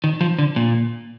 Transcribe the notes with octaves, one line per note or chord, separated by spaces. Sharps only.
D#3
F3
D3
A#2